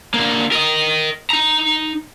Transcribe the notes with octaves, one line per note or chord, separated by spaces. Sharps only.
D3 A#3
A#4 D#5
D#4 A#5